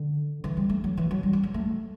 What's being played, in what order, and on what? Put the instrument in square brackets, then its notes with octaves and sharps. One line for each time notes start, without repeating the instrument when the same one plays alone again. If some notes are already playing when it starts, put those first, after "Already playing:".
Already playing: [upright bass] D3
E3
G3
A3
F#3
E3
F#3
G3
G3
F#3
A3